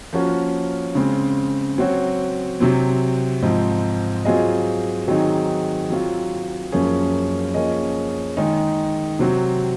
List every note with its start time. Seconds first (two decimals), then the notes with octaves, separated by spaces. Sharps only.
0.13 F3 A#3 C#4 F#4 A#4
0.95 C#3 G#3 C4
1.78 F#3 C4 F#4 C#5
2.60 C3 F#3 C4
3.42 G#2 F3 C4 D#4
4.25 F#3 C4 F4 G#4 D#5
5.08 D#3 F#3 C4 D#4 G#4
5.90 F#3 C4 F4
6.72 F#2 F3 A#3 C#4 G#4
7.54 F3 A#3 C#4 G#4 D#5
8.37 D#3 G#3 D#4 G#4
9.19 C3 F#3 C4 F#4